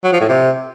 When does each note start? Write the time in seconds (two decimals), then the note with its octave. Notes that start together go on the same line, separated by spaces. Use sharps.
0.04 F#3
0.12 F3
0.21 A2
0.29 C3